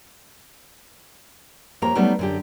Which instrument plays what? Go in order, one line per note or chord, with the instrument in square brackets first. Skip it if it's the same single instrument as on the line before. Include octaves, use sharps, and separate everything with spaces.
[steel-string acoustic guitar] F2 A#3 G4 C#5 A#5
F#3 G3 A3 B3 D#4
F#2 D3 G4